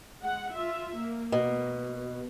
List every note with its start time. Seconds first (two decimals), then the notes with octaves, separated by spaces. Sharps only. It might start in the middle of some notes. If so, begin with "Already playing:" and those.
0.23 G#3 F#5
0.52 F4 E5
0.96 A#3
1.32 B2